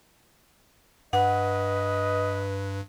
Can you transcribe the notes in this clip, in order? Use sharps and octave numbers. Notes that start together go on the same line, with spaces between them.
G2 B4 D#5 F#5